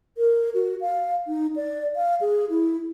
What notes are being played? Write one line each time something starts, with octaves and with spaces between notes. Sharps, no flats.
A#4
F#4
F5
D#4
D5
F5
G#4
E4